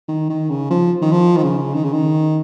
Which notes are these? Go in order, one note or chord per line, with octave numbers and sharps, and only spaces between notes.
D#3
D#3
C#3
F3
D#3
F3
D#3
C#3
D#3
C#3
D#3